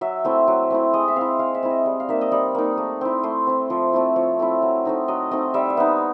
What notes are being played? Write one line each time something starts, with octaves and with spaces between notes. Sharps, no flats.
F#3 E5
A3 C4 E4
F#3
A3 C4 E4
G#3 D#5
E5
C4 E4 F5
G#3 F5
E5
C4 E4
D#5
G3
F5
A#3 D#4 E5
D#5
G3 D5
A#3 D#4
A3
C4 E4
A3 C5
C4 E4
F3
A3 C4 E4
F3 C#5
A3 C4 E4
F#3
A3 C4 D#4
F#3 D#5
A3 C4 D#4 D#5
G3 E5
E5
B3 D#4